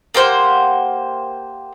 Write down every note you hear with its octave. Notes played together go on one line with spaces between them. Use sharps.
A#3 G4 C5 F#5